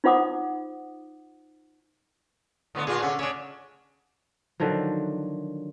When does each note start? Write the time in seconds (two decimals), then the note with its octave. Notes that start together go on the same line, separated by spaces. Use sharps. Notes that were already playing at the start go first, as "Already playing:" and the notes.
0.04 D#4 F4 C5 F#5 D6 D#6
2.75 A2 D3 B3
2.87 A#2 F4 G#4
3.03 D3 C#4
3.19 C#3 C#4 D4
4.60 D3 D#3 F3 F#3